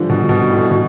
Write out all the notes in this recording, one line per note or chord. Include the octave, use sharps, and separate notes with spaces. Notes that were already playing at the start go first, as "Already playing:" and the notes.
Already playing: D3 E3 F3 G3
B2
B2
A2
B2